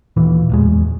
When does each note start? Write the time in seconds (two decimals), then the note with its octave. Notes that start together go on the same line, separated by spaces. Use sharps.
0.16 D#2 A#2 E3
0.50 D1 E2 G#3